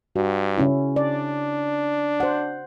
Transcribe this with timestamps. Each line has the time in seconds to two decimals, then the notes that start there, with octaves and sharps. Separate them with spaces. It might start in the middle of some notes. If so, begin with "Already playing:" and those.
0.16 G2 F#4
0.58 C#3 C#4 E4
0.96 D4 D5
2.20 C5 F#5